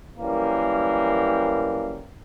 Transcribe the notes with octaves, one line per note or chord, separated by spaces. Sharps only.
F#2 E3 G3 A#3